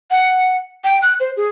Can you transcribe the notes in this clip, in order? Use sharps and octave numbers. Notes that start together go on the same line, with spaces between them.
F#5
G5
F#6
C5
G#4